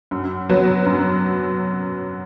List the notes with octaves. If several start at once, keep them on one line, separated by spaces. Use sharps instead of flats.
F#2
F#3 B3
F#2